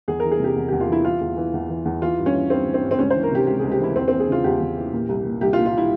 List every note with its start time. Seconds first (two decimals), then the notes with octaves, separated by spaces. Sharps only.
0.08 E2 G#4
0.20 E3 A#4
0.31 G#4
0.40 C3 G4
0.56 E2
0.68 E2 G4
0.80 F4
0.88 E3 E4
1.04 E3 F4
1.21 E2
1.37 E3
1.54 E2
1.69 E3
1.85 E2
2.01 E3 F4
2.18 G2
2.26 C#4
2.34 E3
2.50 G2 C4
2.66 E3
2.74 C4
2.83 G2
2.91 C4
2.99 C#2 C#4
3.10 E3 C5
3.23 A#4
3.31 C3 G4
3.47 C#2 G4
3.59 C#2 G#4
3.71 G4
3.80 E3 E4
3.96 E2 C4
4.08 E3 C4
4.20 G#4
4.28 C#3 F4
4.44 E2 G4
4.60 E2
4.77 E3
4.93 A#2
5.09 C2
5.25 A#2
5.41 C2 G4
5.53 F4
5.57 A#2
5.66 F4
5.78 E4